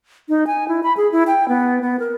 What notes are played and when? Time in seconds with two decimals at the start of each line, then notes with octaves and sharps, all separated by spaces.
0.29 D#4
0.47 G#5
0.68 E4
0.83 B5
0.97 G#4
1.12 E4
1.27 G5
1.49 B3
1.82 B3
2.00 A#4